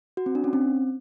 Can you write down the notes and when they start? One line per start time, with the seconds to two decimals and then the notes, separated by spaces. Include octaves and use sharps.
0.17 F#4
0.26 C4
0.35 D4
0.44 C#4
0.53 C4